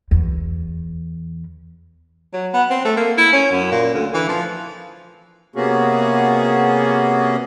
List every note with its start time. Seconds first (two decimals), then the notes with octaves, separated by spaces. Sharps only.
0.11 E2
2.33 F#3
2.54 B3
2.70 C4
2.85 A3
2.97 A#3
3.18 E4
3.33 C#4
3.51 F#2
3.72 A#2
3.94 D2
4.14 E3
4.29 F3
5.56 C3 A#3 B3 C#4 F#4 G#4